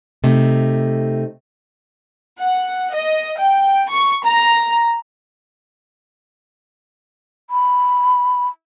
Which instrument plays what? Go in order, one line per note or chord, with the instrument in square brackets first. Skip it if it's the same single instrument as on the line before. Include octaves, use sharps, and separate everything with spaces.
[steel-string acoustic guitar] C3 A3 D#4
[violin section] F#5
D#5
G5
C#6
A#5
[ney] B5